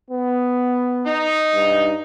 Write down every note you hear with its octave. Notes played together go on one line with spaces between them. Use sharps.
B3
D#4
G2